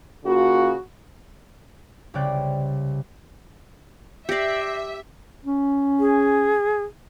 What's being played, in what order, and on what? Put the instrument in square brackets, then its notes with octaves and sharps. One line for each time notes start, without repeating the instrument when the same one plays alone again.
[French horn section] C#3 A#3 F4 F#4
[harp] C2 C#3 C#4 D5 G5 F#6
[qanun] G4 D5 [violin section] E5 [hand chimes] G6 A#6 C7
[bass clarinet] C#4
[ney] G#4